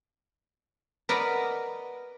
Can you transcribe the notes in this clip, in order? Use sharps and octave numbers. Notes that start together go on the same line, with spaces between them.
A#4 B4 D5 D#5 F#5